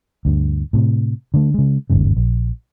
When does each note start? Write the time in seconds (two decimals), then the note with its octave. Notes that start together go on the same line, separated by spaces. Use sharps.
0.25 D2 G2
0.73 A2 C3
1.34 D3 A3
1.54 C#3 G#3
1.90 G1 D#2 G#2 C#3
2.17 A#1